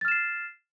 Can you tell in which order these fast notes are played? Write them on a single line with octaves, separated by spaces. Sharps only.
A6 F6 E7 C7